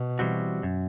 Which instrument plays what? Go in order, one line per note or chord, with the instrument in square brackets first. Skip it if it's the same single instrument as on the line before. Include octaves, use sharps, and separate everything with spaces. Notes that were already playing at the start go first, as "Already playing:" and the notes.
Already playing: [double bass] B2
[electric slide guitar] E3 G3 C4 F#4
F#2